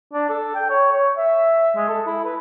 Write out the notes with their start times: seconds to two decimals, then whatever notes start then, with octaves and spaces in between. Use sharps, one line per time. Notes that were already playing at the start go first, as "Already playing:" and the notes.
0.13 D4
0.29 A4
0.55 G5
0.70 C#5
0.92 C#5
1.17 E5
1.76 G#3
1.89 A4
2.07 E4
2.25 B4